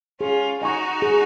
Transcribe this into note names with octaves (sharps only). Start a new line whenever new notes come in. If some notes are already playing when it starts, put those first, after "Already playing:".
C#4 F4 G#4
D#4 F#4 D#5 G#5 C#6
G#4